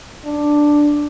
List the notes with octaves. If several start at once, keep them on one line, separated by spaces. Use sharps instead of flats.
D4